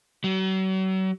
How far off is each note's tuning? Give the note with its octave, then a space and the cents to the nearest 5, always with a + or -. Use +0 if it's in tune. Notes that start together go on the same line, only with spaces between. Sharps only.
F#3 +40